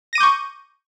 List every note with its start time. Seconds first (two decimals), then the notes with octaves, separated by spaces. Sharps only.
0.13 A#6
0.15 D#7
0.18 D6
0.20 G6
0.23 C#6